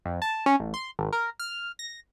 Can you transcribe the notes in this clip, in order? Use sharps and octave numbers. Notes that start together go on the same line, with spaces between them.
F2
A5
C#4
A1
C6
G#1
A#4
F6
A#6